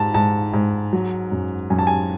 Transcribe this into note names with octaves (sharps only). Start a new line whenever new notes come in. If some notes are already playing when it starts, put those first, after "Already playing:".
Already playing: G#2 A5
G#2 A5
G#2
F#3
F#2
F#2 G#5
A5
G#5